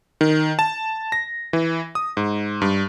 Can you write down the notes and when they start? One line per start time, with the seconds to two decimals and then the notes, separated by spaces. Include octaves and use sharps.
0.21 D#3
0.59 A5
1.12 A#6
1.53 E3
1.95 D#6
2.17 G#2
2.62 G2